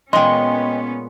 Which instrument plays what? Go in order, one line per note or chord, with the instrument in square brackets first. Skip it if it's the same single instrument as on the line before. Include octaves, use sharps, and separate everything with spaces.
[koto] A#2 G#3 [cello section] B3 C#4 [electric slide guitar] D#5 G5 [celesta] C6